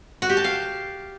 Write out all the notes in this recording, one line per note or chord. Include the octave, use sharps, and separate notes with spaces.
F#4
G4
A5
F5